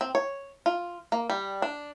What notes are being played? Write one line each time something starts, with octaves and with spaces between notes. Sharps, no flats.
C4
C#5
F4
A#3
G3
D4